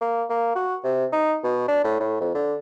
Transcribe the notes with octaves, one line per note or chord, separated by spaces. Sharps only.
A#3
A#3
F#4
C3
D#4
B2
D4
A2
A2
F2
D3